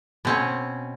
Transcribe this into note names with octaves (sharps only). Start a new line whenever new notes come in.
B2 C4 C#4